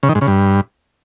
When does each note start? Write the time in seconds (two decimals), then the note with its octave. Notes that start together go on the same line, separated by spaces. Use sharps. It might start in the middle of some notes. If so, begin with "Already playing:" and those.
0.03 C#3
0.09 D#3
0.15 G#2
0.21 C#3
0.27 G2